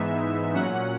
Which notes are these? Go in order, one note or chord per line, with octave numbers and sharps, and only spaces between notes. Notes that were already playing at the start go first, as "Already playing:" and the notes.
Already playing: G#2 E3 G#3 B3 D#4 E5
A#2 F#3 C#4 F#5